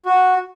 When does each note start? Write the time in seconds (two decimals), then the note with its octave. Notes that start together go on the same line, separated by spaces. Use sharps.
0.05 F#4